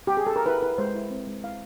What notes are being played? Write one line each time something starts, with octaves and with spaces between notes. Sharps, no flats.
G4
G#4
A4
A#4
E4 B4
E4 B4
G#3 C5
E4
C4
G#3
E4 F5